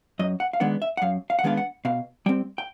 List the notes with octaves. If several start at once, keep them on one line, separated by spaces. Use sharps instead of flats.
F#2 D#5
F#5
F5
D#3 G#3 B3 D4 F#5
E5
F#5
F#2 F5
F5
F#5
D#3 G#3 B3 D4 F5
F#5
B2 F5
G3 C4 G5
G5